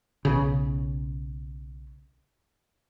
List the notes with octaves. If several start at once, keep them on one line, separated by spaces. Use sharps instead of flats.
B1 C#3